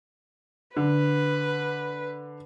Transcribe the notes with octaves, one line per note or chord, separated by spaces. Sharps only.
D3 B4